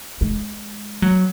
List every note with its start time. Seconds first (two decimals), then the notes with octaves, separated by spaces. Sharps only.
0.21 G#3
1.02 F#3